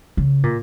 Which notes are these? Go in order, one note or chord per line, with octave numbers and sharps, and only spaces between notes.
C#3
A#2